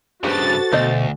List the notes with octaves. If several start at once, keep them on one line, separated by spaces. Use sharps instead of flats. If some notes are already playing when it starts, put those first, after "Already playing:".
G2 C#3 F#4 G4 A4 B4 C5 A6
D2 B2 A3 C5 D#5